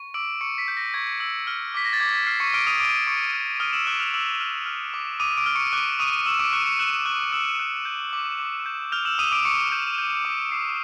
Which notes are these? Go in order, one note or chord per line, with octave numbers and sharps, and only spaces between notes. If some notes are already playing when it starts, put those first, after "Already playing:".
Already playing: C#6
D6 E6 D7
C#6 C#7
B6
G6
A#6
C#6 G#6
E6
F6
D6 B6
A#6
A6
D6 G#6
B6
F6 C7
C#6 C#7
D6 F6 D7
D#6 D#7
D6 D7
C#6 D6 C#7
F6
D#6 F6 D#7
E6 E7
D6 F#6 F#7
F6 F7
D6 E6 E7
F6
F6
D6
D6 D#6 D#7
D6 D7
F6
C#6 C#7
D6 F#6 D7
C#6 D#6 D#7
C#6 E6 E7
D6 D7
C#6 F#6 C#7
C#6 C#7
E6 F#6 E7
C#6 F#6 F#7
C#6 E6 E7
F#6
G6
D6
D6
G6
F6 G6 F7
E6 E7
D6 D#6 D#7
D6 D7
C#6 D6 C#7
G6
G6
D6
D6 C7